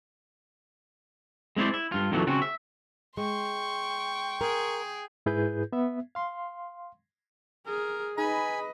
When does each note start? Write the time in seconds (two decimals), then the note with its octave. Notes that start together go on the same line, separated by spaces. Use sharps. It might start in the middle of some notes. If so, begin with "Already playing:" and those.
1.56 G#3 C4 E4 C5 D5
1.74 E4
1.92 G2 F4
2.12 F2 A#2 D#3 E3 F#3 A3
2.27 C#3 C4 F#4
2.42 E5
3.17 G#3 G5 C6 C#6
4.41 G#4 A#4
5.26 G#2 E4 G#4 B4 G6
5.73 B3 E5
6.15 F5 C6
7.67 G#4 A#4
8.18 D#4 G#4 B4 D#5 G#5 A#5 B5